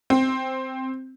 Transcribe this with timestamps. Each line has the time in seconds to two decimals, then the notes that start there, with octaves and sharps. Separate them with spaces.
0.10 C4